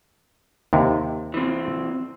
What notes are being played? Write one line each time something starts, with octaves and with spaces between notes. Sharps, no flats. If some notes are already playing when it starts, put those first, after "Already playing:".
D#2 C3
E3 C4